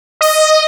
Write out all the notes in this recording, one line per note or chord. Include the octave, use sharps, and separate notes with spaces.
D#5